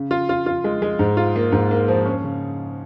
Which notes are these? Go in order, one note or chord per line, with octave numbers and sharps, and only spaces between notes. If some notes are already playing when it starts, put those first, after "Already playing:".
Already playing: C#3
F4
F4
F4
G#3
G#3
G#2
F4
A#3
G#2
A#3
F3
C#4
C#3